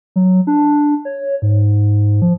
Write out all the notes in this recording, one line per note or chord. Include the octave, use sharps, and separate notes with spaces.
F#3
D4
C#5
G#2
F3